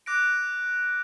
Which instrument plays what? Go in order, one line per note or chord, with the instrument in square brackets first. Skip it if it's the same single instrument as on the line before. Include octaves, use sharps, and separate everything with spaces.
[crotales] D6 F#6 A#6 D7